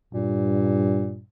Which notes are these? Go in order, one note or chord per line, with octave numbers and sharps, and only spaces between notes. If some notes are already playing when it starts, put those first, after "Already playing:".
G2 A#2